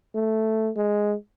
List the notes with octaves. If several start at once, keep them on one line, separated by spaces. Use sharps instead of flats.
A3
G#3